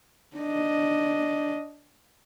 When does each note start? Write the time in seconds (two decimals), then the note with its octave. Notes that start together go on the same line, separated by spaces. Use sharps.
0.37 D4 D#5